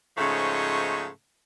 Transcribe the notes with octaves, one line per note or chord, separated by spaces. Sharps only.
G#2 C#3 F3 A3 C#5 D#5